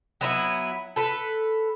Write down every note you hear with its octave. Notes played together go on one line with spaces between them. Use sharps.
F#3 B3 E4
A4 B4